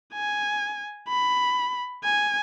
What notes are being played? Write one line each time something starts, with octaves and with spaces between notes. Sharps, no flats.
G#5
B5
G#5